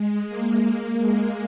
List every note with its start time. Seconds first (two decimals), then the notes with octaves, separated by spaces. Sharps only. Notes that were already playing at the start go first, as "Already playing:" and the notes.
Already playing: G#3
0.28 A#3
0.65 A#3
0.99 G#3